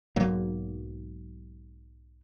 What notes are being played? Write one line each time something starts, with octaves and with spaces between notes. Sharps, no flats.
B1 G#2 F#3 A#3